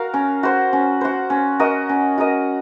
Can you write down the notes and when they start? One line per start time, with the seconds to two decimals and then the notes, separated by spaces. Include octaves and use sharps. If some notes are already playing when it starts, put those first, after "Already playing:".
Already playing: F#4 A#4 F5
0.14 C#4
0.43 F#4 C5
0.73 C#4
1.01 F#4 C5
1.30 C#4
1.59 F#4 A#4 D#5
1.89 C#4
2.18 F#4 A#4 D#5